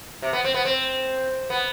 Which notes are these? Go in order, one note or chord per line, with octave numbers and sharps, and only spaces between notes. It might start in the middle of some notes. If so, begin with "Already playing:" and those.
C3
B3
C4
B3
C4
B3